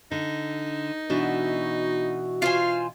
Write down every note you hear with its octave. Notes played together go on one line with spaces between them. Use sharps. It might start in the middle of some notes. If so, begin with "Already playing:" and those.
D3 D#4
B2 E3 D4 F#4
F4 C5 F5 G#5